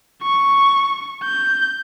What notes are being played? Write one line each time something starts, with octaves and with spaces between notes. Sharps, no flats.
C#6
G6